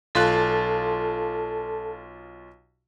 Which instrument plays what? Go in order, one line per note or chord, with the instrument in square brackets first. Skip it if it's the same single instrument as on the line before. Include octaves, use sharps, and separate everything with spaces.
[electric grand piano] B1 F4 F#6 [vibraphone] A4 A5